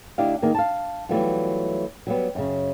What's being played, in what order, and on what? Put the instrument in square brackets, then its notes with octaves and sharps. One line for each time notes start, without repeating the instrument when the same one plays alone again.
[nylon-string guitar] D2 D4 E4 G4 D#5 F5
D#3 A#3 G#4
F5 A5
E3 F#3 G3 A3 B3 F4
F#3 G3 B3
F#2 C#3